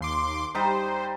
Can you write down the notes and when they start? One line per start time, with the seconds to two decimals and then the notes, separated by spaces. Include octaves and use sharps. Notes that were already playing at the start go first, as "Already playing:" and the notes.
0.01 D#2 C6 D6
0.55 G3 D#4 C5